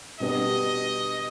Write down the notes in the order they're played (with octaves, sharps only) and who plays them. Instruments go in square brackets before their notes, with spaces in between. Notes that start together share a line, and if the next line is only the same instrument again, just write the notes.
[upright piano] B2 G3 B3 D4 G4 [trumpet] D#5